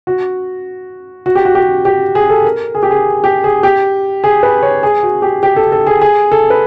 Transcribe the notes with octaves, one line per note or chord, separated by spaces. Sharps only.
F#4
F#4
G4
F#4
G4
G4
G#4
A4
A#4
G#4
G4
G#4
G4
G#4
G4
G#4
B4
C#5
G#4
F#4
G4
G4
A4
A4
G#4
G#4
A4
B4